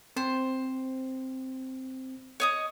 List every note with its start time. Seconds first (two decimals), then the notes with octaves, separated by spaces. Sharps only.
0.17 C4 C5
2.40 C#5 D#5 D#6